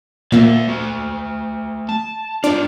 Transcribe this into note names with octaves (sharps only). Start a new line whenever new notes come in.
A#2 A#3 D5 E5 E6
A3 F#4
A5
G2 D4 F4 D5